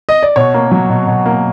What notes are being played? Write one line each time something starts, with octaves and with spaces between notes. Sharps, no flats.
D#5
D5
B2 C#5
A#3
F#3
B2
B2
A#3